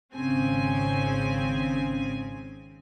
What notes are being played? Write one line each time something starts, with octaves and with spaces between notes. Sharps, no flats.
G#1 C#3 C4 G#5